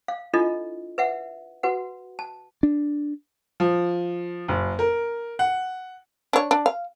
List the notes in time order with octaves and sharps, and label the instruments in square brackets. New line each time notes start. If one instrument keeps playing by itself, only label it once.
[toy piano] F5
D4 E4 F4 A4 D#5
B4 E5 F#5
F#4 B4 F#5
A5
[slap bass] D4
[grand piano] F3
F#1
A#4
F#5
[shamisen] D4 C#5
D4
F5